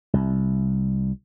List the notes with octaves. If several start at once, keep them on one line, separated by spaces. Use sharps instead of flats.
C2